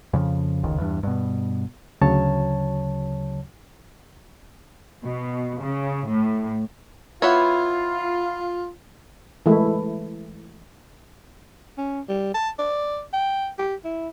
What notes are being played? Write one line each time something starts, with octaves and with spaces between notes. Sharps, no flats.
F2 C#3 F3
F1 C#2 D#3
E2 G2
G2 B2
D2 C#3 F#3 C#5 A5
B2
C#3
A2
B3 E4 F4 C#5
E3 G#3 A3 E4
C#4
G3
A5
D5
G5
G4
E4